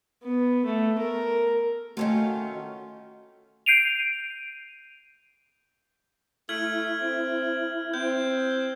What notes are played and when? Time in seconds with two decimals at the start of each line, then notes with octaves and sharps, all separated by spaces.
0.23 B3
0.65 A3
0.99 A#4
1.97 D#3 A3 C#4 F4 F#4
3.66 G6 C7 D7 D#7 F7
6.49 A3 E4 F6 G#6 F#7
7.01 C4
7.94 C4 G6